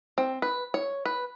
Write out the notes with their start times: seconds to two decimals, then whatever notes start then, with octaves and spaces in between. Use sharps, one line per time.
0.18 C4
0.42 B4
0.74 C#5
1.05 B4